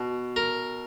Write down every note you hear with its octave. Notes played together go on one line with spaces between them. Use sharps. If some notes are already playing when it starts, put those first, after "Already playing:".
Already playing: B2
A#4